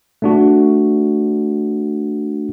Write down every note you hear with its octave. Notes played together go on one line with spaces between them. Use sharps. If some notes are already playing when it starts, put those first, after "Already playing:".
A3 D4 F#4